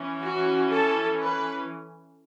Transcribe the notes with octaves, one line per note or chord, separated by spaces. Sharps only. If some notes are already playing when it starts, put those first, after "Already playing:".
Already playing: E3 C#4
F#4
A4
B4